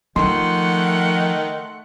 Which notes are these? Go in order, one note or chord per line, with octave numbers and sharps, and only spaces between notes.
D#3 F3 A3 F#5 C6